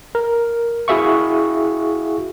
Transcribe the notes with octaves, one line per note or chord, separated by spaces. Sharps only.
A#4
E4 F#4 G#4 E5 F5 C#6